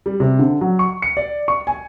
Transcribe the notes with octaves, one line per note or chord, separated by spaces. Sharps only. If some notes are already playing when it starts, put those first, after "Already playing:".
G3
C3
D3
F#3
C#6
C#7
D5
C#6
G#5